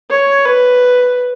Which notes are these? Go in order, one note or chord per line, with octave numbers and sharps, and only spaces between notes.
C#5
B4